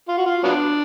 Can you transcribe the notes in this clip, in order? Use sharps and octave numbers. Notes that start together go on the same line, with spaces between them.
F4
F#4
F4
F#3 B3 D4